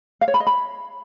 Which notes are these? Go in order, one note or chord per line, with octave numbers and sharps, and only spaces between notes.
F5
C#5
B5
D#5
B5